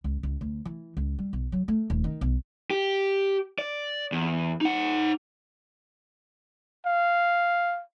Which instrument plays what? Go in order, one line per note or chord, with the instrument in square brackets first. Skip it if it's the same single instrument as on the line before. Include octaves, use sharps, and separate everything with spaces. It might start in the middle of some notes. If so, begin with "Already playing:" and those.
[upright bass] C#2
C#2
D2
E3
C#2
G3
B1
F#3
A3
D#1
D#3
B1
[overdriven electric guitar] G4
D5
E2
D#4 F#5
[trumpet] F5